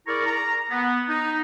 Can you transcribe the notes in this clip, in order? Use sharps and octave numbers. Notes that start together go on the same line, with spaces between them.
E4 G#4 A#4 D5 A#5 C#6
A#5
B3
D#4